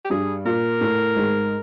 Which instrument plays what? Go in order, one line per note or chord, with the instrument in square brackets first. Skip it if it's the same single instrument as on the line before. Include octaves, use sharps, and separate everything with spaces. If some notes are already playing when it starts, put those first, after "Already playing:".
[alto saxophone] G4
[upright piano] G2 G3 [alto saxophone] G#4
[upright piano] A#2 A#3 [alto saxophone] A#4
[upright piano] A2 A3
G#2 G#3